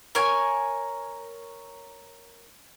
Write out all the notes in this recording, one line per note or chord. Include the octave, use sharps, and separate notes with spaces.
A#4 C#5 G#5